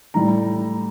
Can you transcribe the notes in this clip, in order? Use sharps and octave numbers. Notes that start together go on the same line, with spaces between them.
A2 G3 A#5